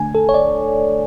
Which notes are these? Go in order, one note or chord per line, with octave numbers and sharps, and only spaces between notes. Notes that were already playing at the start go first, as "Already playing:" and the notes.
Already playing: D3 A3 D4 G#5
A4
C#5
D5